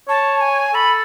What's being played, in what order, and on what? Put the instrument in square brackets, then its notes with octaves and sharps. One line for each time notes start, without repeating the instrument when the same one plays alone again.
[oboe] C#5 [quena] A5
[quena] G#5
[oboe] A4 [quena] B5